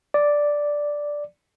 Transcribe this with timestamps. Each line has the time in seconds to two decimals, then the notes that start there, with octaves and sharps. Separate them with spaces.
0.14 D5